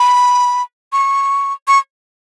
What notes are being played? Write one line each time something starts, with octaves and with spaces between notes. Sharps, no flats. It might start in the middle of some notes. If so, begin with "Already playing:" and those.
Already playing: B5
C#6
C#6